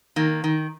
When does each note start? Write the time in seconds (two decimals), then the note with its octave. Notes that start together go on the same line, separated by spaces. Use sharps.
0.16 D#3 A#3
0.44 D#3